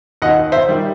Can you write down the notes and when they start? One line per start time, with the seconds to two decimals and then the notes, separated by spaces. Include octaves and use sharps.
0.22 D#2 D#5 F#5
0.52 C5 E5
0.68 D#3 G3